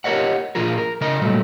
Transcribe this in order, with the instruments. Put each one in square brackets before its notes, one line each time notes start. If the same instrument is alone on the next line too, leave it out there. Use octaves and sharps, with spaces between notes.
[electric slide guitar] G4 A#4 C#5 D#5 F#5
A#2 F3 F4 G#4 A#4
A#4
C#3 A#4 D#5
A#2 F#3 G3 A3